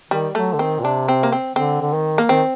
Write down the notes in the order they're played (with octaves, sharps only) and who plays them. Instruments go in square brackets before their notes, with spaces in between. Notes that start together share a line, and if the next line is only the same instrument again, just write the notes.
[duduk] D#3 [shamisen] G3
[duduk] F#3 [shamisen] A3
[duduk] D3
[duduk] D#3 [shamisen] C4
[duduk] A#2
[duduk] C3 [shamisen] D4
[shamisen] C4
A#3
C4
[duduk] D3 [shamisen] C4
[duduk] D3
D#3
[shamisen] A#3
[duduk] D#3 [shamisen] C4